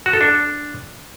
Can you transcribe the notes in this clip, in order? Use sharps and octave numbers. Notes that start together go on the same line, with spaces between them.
F#4
A4
D4